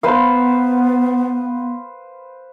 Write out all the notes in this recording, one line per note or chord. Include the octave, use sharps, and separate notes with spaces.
B3 B4 C5 F5